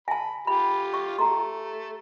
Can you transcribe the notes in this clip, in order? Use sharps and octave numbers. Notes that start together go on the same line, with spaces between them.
G#5 A5 B5
F4 G4 B5
C#6
A3 G4 A#5 C6